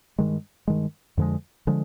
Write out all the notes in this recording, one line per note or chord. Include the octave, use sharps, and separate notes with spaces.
G2 D#3 G#3
G2 D#3 G#3
F2 D3 F3 G#3
D3 F3 G#3